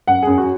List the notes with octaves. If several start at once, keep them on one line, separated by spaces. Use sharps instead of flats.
F#2 F#5
F#2 G#4
F#4